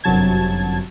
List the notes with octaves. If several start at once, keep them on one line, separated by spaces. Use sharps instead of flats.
G1 F#2 C3 F#3 A5 G#6